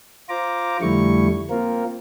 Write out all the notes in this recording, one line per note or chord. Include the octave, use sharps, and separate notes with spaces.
F4 C5 A#5 D6
F2 D3 G3 A3 E4 C#6
A#3 C4 F4 A#4